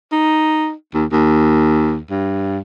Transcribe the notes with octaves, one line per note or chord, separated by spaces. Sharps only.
D#4
D#2
D#2
G2